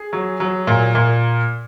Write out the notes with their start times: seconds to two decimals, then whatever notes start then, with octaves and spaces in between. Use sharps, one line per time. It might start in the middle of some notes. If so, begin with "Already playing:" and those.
Already playing: G#4
0.13 F#3
0.40 F#3
0.67 A#2
0.95 A#2